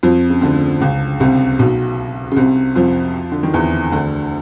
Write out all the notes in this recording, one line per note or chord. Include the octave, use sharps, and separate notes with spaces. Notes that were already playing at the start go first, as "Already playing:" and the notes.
F2 F3
C#3
D2 D3
C#2 C#3
C2 C3
B1 B2
C#3
C2 C3
F2 F3
D3
D#3
E2 E3
D2 D3